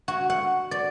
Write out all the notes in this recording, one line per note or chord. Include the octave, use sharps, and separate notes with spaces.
F#4
F#5
D5